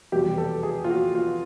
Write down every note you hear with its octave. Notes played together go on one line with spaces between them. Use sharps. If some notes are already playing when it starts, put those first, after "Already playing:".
F1 E2 B2 G3 G4
A4
G#4
F4
F#4
F4